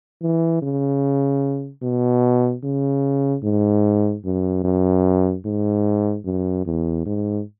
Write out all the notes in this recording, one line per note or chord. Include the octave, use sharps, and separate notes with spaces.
E3
C#3
B2
C#3
G#2
F#2
F#2
G#2
F#2
E2
G#2